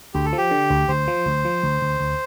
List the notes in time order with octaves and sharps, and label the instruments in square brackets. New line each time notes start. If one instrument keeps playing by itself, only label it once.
[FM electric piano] D2 [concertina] G4
[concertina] A4
[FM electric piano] F3 [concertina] G4
[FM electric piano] D3
D2
[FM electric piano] D2 [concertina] C5
[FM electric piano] F3
D2
F3
D2
D2
D2